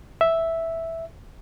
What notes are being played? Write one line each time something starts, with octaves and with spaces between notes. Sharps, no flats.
E5